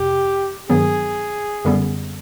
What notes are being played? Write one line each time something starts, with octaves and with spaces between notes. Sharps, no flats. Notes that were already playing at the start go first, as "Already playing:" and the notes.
Already playing: F2 C3 G4
G2 D#3 F#3 B3 G#4
F#2 D3 G3 B3